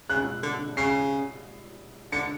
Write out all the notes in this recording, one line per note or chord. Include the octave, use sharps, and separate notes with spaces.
C#3 F#6
D3
C#3 C7
D3 C#7